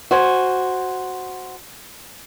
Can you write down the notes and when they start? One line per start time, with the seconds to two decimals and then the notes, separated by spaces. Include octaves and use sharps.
0.11 F#4 C5 G#5